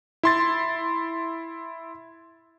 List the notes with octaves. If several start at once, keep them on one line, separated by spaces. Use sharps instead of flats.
E4 C6 A6